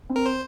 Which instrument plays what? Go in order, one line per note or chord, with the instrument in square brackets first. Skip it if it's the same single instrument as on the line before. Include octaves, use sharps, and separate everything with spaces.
[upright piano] C4
[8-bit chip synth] A#4
C5